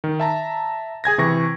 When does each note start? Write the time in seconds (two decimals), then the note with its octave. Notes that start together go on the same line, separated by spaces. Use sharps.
0.04 D#3
0.20 E5 A5 A#5
1.04 G#4 G#5 G#6 A#6
1.18 C3 E3 C#6 A#6